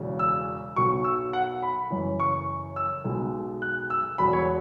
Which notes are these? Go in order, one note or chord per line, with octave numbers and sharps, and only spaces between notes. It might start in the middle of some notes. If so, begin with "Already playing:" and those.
Already playing: E1 E2 C#3 F#3
E6
B1 B2 F#3 C#6
E6
F#5
B5
F#1 F#2 E3
C#6
E6
B1 B2 G#3
F#6
E6
E1 E2 B2 F#3 B5
C#5